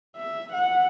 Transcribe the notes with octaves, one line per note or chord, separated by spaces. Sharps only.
E5
F#5